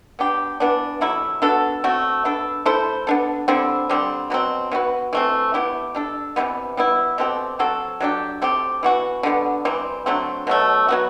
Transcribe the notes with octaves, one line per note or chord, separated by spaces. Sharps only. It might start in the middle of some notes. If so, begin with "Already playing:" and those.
B3 D4 G4
E3 B3 D4
C3 F#3 A3 E4
B3 D4 F#4 A4
A3 C4 F#4
B3 D4 A4
A3 E4 A4 C5
B3 D4 A4
D3 G3 C4 E4
D3 G3 C4
B2 F#3 C4
E3 B3 F#4 B4
E3 A3 C4
B3 E4 G4
G3 D4 A4
C3 E3 G3 B3
G3 B3 E4
B2 A3 C4 G4
F#3 C4 F#4 A4
F#3 A3 D4 G4
A3 C4 G4
E3 B3 F#4
D3 G3 B3
C3 E3 G3 C4
D3 F#3 A3 C4
B2 F#3 A3
F#3 B3 F#4